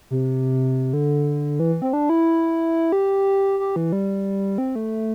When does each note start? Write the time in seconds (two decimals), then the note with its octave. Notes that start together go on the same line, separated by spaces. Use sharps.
0.11 C3
0.93 D3
1.60 E3
1.82 C4
1.93 D4
2.09 E4
2.92 G4
3.60 G4
3.76 E3
3.92 G3
4.58 C4
4.76 A3